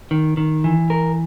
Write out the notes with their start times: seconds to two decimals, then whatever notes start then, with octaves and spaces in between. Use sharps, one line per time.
0.11 D#3
0.37 D#3
0.64 E3
0.90 A#4